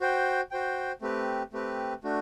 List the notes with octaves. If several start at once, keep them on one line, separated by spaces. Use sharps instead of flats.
F#4 C5 G5
F#4 C5 G5
A3 C4 G4 B4
A3 C4 G4 B4
A3 D4 F#4